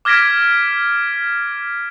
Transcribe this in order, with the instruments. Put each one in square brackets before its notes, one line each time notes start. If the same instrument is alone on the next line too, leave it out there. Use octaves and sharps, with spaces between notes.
[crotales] D6 F6 G#6 A#6 B6 D7